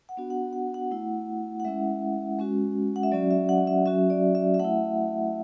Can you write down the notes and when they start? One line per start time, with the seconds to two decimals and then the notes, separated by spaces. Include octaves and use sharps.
0.09 F#5
0.17 B3 D4 F#4
0.30 F#5
0.53 F#5
0.74 F#5
0.91 A3 E4
1.60 F#5
1.65 G#3 C#4 E4 E5
2.39 G#3 C#4 F#4
2.96 F#5
3.03 E5
3.12 F#3 C#4 F#4 D5
3.31 E5
3.49 F#5
3.67 E5
3.86 F#3 C#4 F#4 E5
4.10 D5
4.35 E5
4.54 E5
4.60 A3 E4 F#5